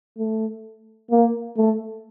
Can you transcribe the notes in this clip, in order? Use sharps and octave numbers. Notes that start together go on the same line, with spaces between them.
A3
A#3
A3